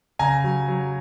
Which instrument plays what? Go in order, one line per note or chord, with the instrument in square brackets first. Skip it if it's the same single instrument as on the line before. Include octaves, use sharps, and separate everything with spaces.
[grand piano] C#3 G#5 A#5
F#3
F#3